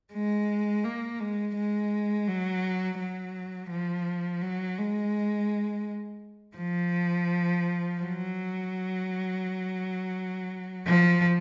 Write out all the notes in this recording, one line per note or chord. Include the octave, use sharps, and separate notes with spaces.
G#3
A#3
G#3
G#3
F#3
F#3
F3
F#3
G#3
F3
F#3
F3